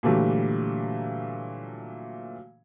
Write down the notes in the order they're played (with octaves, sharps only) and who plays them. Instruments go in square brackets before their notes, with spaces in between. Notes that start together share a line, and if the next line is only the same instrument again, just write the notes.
[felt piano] A#2 D3 E3 F#3 G3 A3